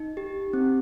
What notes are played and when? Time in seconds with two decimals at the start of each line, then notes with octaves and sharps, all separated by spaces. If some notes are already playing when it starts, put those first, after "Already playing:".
Already playing: D#4
0.17 G4
0.53 C4